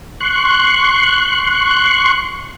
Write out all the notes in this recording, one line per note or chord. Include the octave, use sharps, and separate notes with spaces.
C6 C#6 F#6